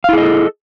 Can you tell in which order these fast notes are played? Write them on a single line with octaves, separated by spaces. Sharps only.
F5 E4 G#4 D#5 A4